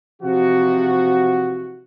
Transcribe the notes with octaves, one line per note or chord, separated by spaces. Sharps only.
C3 E3 F3 F#4